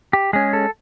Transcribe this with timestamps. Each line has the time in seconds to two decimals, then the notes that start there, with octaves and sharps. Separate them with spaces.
0.13 G4
0.33 G#3 C#4 G#4
0.53 A4